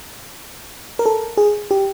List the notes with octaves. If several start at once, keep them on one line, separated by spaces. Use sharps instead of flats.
A#4
A4
G#4
G4